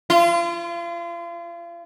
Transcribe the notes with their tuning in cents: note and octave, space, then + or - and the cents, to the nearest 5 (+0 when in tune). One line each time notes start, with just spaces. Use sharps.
F4 -35